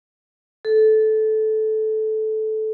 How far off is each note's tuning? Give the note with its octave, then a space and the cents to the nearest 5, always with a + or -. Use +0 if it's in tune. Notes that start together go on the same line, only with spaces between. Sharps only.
A4 -15